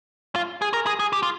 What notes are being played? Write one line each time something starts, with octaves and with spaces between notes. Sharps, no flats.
F4
G#4
A#4
G#4
G#4
G4
F4